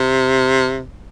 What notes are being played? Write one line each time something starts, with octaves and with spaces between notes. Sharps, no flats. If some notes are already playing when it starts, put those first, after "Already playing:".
Already playing: C3